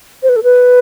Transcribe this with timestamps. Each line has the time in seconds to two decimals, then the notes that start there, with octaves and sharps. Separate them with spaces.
0.23 C5
0.29 B4
0.36 A4
0.43 B4